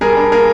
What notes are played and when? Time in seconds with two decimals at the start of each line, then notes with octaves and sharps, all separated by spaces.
0.01 G3 G#4 A#4
0.16 D4
0.32 A#3 G#4 A#4